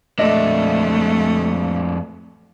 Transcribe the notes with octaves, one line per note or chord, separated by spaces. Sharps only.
F2 A3 D4 D#5 E5